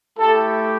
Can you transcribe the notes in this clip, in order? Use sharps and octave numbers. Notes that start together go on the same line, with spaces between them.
A3 E4 G4 A4